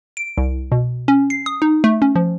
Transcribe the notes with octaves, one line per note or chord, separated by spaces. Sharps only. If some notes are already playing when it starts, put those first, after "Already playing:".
D7
C2
B2
C#4
C7
D#6
D#4
A3
C#4
F3